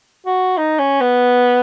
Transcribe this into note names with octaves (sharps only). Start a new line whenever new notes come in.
F#4
D#4
C#4
B3